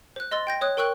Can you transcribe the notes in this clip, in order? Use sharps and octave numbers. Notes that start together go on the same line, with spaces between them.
C5 F#6
D#5 C6 E6 A6
G5 G6 A#6
C#5 D#6 F#6
A#4 G5 C#6 E6 F#6 F#7